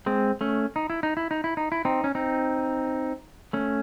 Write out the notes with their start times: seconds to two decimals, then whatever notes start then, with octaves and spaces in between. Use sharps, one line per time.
0.06 G#3 C4
0.41 A3 C#4
0.76 D#4
0.90 E4
1.03 D#4
1.17 E4
1.31 D#4
1.44 E4
1.57 D#4
1.72 E4
1.85 C4 D#4
2.04 C#4
2.15 C4 D#4
3.53 A3 C#4